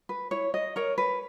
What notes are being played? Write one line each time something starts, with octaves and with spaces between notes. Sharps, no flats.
B4
E4 C#5
D#5
A#4 C#5
B4